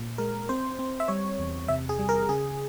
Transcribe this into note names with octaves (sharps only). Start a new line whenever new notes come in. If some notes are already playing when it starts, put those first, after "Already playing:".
Already playing: A#2
G#3 A#4
C4 C5
C4
E5
G3 C#5
E2
C3 E5
G#4
G3
A#4
C#3 G#4